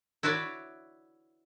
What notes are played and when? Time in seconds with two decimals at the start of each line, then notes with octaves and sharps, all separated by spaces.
0.23 E4 F#4 B4 C#5 D5 E5